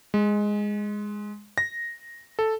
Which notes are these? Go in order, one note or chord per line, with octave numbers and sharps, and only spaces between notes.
G#3
A#6
A4